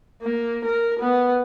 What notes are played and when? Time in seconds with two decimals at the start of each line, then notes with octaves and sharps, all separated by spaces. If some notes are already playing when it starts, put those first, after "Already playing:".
0.22 A#3
0.65 A#4
0.99 B3